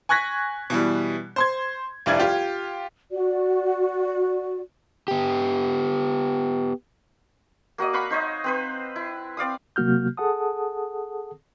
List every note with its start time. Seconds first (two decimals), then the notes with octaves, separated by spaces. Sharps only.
0.09 G#5 C#6 F#6 G#6 A#6 B6
0.70 B2 E3 G3
1.36 C5 C6 G#6
2.06 F1 G2 G3 E4 D5 G#6
2.19 F4 G4
3.11 F#4 D5
5.08 B3 G4
7.78 A#3 F#4 D5 D#5
7.93 F5 F#5 B5 C#6
8.10 D#4 C5 C#5 D#5
8.44 C4 B4 C5
8.96 E4
9.37 C4 D5 F5 D#6
9.76 C3 F#3 A#3 F#4 F6 G6
10.17 G#4 A4 F#5 A5 D#6